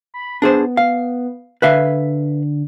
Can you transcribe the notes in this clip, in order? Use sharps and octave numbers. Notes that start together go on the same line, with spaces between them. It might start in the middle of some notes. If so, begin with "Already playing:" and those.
B5
B3 D4 G#4 C5
F5
D3 B4 E5 F5